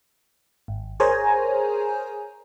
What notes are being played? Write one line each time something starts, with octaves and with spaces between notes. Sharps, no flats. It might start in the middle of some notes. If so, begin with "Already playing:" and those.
G#1
G#4 A#4 C5 C#5 G#5 A#5